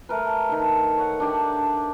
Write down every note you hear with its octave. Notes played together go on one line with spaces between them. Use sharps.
A3 A#4 B4
D#3 A4
C#5 F#5
D4 G4 D5